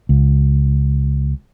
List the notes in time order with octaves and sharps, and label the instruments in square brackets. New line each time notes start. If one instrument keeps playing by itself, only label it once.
[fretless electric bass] C#2